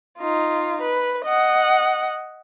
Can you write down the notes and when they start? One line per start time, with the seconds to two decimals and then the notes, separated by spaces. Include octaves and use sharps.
0.18 D#4 F4
0.81 B4
1.25 D#5 F#5